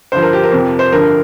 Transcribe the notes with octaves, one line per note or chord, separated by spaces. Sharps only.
G2 D3 F3 C5
A#4
G4
A#4
F2 C3 F3
C5
G2 D3 F3 A#4